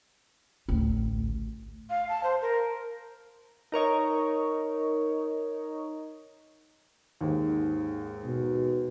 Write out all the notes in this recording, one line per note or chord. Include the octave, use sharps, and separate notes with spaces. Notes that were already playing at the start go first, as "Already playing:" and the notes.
A1 D2
F5
A5
C5
A#4
D#4 A#4 C#5 D#5
D#2 G#2
B2